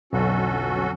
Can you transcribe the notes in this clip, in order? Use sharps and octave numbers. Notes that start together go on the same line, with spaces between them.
B1 F2 D3 F#3 C#4 F#4 A4